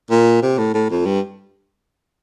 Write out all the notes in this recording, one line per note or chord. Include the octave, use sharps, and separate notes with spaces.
A#2
C3
A2
A2
F2
G2